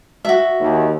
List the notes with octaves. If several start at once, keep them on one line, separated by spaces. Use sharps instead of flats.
F#4 E5
D#2